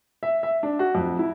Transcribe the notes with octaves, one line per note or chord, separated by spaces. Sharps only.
E5
E5
D4
F#4
F2
E4